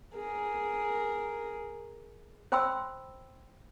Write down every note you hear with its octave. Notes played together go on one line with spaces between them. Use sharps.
G#4 A#4
C5 G5 B5 C6 E6